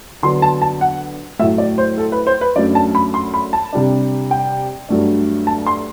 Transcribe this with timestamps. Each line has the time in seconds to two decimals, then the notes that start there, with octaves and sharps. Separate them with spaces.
0.23 D3 F#3 B3 D4 C6
0.42 A5
0.62 A5
0.81 F#5
1.39 A2 F#3 A3 E5
1.58 D5
1.78 C5
1.98 A4
2.12 B4
2.27 C5
2.41 B4
2.56 F#2 F#3 A3 D4 D5
2.75 A5
2.95 B5
3.14 C6
3.34 B5
3.53 A5
3.73 C3 G3 D4
4.31 G5
4.89 G2 F#3 A3 D4
5.47 A5
5.67 C6